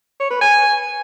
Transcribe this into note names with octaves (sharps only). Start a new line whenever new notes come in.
C#5
B4
G#5